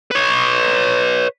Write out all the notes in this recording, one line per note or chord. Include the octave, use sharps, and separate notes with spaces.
B4 C#5